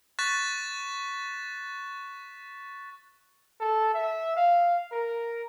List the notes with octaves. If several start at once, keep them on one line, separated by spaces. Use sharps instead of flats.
C#6 F#6 A6 B6 E7
A4
E5
F5
A#4